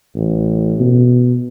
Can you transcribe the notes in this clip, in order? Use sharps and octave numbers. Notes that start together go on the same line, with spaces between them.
A1
B2